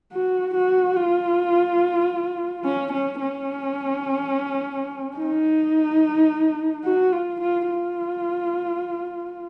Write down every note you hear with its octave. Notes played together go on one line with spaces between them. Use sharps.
F#4
F#4
F4
C#4
C#4
C#4
D#4
F#4
F4
F4
F4